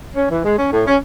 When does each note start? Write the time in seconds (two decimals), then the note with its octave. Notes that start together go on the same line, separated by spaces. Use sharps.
0.14 C#4
0.28 E3
0.43 G#3
0.56 C#4
0.71 A2
0.85 C#4